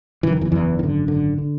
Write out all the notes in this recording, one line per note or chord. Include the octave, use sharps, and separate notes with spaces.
F#1 F#2 C#3 E3
D#3
E2 E3
E2 E3
G#1 F#2 D3 D#3
D3
D3